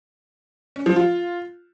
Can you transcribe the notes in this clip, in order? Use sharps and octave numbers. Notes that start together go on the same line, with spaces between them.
C#4
F3
F4